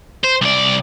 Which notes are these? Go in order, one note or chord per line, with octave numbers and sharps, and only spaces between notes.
C5
C2 D5